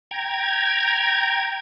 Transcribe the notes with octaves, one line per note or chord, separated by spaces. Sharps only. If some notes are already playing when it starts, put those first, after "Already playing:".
G5 A#5 G#6